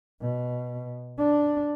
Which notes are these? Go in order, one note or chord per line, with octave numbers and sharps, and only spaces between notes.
B2
D4